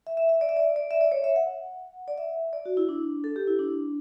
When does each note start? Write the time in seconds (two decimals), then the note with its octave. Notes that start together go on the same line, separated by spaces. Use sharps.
0.07 E5
0.17 E5
0.29 E5
0.41 D5
0.49 E5
0.57 D5
0.76 D5
0.91 E5
1.01 D5
1.12 C#5
1.24 E5
1.36 F#5
2.08 D5
2.18 E5
2.53 D5
2.66 F#4
2.77 E4
2.89 D4
3.24 A4
3.36 G4
3.47 E4
3.59 D4